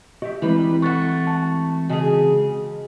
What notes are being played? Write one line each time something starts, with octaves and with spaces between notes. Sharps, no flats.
F#4 G4 D#5 E5
E3 G3 G#3 C4 E4 B4
A3 F#4 C#6 F#6 A6
A5
C#3 F#4 G#4 D#5 A5